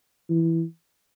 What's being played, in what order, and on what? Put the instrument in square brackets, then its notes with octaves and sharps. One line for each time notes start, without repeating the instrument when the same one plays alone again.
[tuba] E3